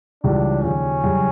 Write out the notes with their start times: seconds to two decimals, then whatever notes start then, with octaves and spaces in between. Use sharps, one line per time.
0.24 C#2 C#3 E3 G3 D4
0.63 D#2 C#3 F3 C#4
1.03 F#2 C#3 E3 G3